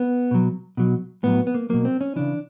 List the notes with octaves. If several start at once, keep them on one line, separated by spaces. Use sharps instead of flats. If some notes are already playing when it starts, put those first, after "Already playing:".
Already playing: B3
B2 F#3
B2 F#3
A2 F#3 B3
B3
A#3
B2 F#3 A#3
C4
C#4
C#3 E3 D4